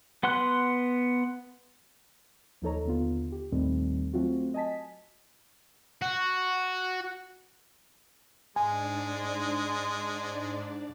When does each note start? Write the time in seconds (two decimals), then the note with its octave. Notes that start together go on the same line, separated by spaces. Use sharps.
0.23 B3 F#5 C6 F#6
2.62 D#2 F3 D#4 A4 C#5 A#5
2.85 D#2 D3 B3 F4
3.32 G4
3.52 D#2 A#2 D#3 G3 A3 C4
4.13 F#3 A3 C4 F4 F#4
4.54 D#5 G#5 A5 B6
6.02 F#4
8.56 G#2 G#3 D4 D5 G#5